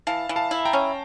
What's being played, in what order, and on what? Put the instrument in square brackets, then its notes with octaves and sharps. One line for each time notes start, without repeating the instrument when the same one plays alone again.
[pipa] E3 [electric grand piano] F5 A5
[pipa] E3
[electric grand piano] F5 A5
[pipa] E4
[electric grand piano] G5 A#5
[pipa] C#4